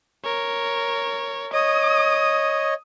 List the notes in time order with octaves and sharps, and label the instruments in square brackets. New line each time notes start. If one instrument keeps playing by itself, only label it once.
[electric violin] A#4 C#5
[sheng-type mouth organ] C#5 D#5 [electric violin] D#6